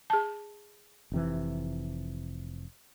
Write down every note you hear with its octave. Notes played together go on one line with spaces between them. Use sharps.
G#4 A5
F1 C3 E3